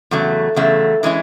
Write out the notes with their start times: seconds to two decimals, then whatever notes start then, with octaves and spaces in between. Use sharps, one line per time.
0.11 E2 C#3 F#3 A3
0.56 E2 C#3 F#3 A3
1.03 E3 G#3 C#4 E4